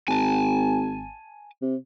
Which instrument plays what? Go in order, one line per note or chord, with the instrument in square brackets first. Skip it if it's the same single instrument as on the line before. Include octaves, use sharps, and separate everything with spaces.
[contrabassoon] G#1 [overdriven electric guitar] G#5 A5
[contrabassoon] C3